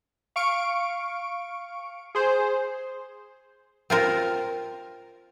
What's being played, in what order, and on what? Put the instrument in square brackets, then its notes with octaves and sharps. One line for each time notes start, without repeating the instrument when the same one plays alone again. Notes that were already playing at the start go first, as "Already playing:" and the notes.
[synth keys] F5 C#6 D7
G#4 C5
[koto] C4 F4 A#4 C5